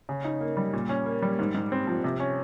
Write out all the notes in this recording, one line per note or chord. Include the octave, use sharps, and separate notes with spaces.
C#3
D#4
A#3
G3
A#2
C#4
A#3
G3
G#2
G#2
C4
F3
C3
C#4